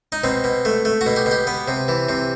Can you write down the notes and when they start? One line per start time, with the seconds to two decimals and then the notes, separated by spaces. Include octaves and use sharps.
0.12 D#4
0.24 B2 C4
0.44 B2
0.65 A3
0.85 A3
1.01 F#4
1.06 B2
1.16 G4
1.26 B2
1.31 G4
1.47 B3
1.68 C3
1.88 E3
2.09 C3